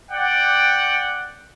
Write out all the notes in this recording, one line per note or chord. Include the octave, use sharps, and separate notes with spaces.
D5 F#5 G5